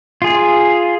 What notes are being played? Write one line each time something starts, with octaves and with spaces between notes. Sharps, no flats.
F4 G#4